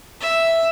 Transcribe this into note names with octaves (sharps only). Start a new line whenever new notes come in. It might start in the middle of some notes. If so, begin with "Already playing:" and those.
E5